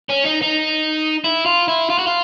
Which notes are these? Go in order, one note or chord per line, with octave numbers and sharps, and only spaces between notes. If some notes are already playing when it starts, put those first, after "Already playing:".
C#4
D#4
D#4
E4
F4
E4
F4
F#4
F4